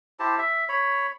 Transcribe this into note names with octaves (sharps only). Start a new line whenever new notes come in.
E4 G4 C5 A5
E5
C#5 B5